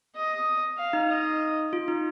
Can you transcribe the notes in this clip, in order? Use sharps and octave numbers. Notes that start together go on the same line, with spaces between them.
D#5
F5
D#4
D#5
F4
D#4